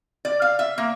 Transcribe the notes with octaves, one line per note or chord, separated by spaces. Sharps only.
D5
F5
E5
A#3